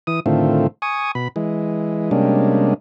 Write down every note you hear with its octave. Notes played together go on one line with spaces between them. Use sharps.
E3 D#6
A2 D3 D#3 A3 C4 F4
G#5 C#6 D#6
B2 B5
E3 G#3
C3 G3 G#3 A#3 C#4 D4